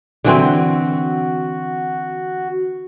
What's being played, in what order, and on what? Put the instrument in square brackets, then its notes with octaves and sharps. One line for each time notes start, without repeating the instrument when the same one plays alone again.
[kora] D3 E3 C4 [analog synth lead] F#4